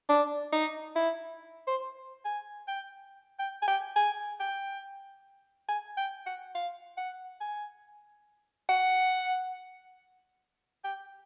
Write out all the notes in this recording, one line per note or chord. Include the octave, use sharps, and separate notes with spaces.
D4
D#4
E4
C5
G#5
G5
G5
G#5
G5
G#5
G5
G#5
G5
F#5
F5
F#5
G#5
F#5
G5